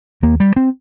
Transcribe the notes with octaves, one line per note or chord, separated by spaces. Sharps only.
D#2 A#3
G3
C4